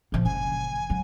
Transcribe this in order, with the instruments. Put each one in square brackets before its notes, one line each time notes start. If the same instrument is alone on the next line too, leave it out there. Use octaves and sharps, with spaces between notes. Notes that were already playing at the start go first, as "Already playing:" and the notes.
[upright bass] A#2 F3
[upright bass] F#1 [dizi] G#5
[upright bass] F#3